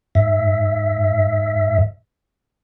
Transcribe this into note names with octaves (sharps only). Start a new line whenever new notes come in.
G#2 E5